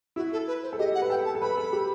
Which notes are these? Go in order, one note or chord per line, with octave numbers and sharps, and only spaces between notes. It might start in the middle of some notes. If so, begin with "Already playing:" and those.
E4 F#4
A4
B4
C5
A4
G4 D#5
F#5
B4
A4 G5
A5
A4
B4 B5
A4
G4